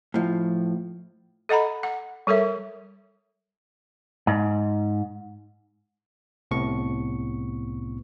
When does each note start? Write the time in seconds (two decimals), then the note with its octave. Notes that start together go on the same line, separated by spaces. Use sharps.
0.14 A2 F3
1.49 A4 D#5 F#5 A#5 B5
1.83 F#5
2.27 G3 A4 A#4 C#5 E5
4.27 G#2
6.51 C2 A2 C3 B3 C#6